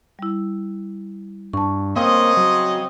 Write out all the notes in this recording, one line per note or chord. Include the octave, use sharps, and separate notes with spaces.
G3 E4
G2 A5 C#6
C#3 A#3 C4 D#5
F#3